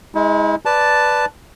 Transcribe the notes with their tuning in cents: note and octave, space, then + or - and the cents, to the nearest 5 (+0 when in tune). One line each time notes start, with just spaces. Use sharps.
G#3 +0 E4 -40
B4 +0 D5 +0 A5 +0